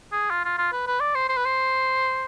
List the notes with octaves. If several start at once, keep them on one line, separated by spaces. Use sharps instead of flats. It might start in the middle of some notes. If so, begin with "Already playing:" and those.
G#4
F4
F4
F4
B4
B4
D5
C5
C5
B4
C5